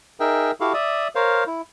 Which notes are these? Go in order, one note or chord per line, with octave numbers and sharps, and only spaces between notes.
D#4 G#4 A#4 E5 G5
E4 F#4 G4 A4 F5
D5 E5 D#6
A#4 C5 C#5 F5
E4